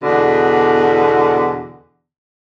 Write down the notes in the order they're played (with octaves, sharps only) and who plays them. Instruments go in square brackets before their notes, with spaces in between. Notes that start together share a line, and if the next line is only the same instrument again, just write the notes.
[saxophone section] E2 B2 D3